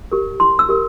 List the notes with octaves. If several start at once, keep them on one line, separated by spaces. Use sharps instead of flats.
G4 A#4
E4 C6
E6
G4 A#4